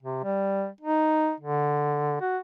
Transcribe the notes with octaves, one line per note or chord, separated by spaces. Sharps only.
C3
G3
D#4
D3
F#4